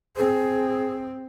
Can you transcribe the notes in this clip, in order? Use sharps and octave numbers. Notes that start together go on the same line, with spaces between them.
C4 G#4